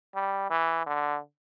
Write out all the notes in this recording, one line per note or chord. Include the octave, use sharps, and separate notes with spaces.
G3
E3
D3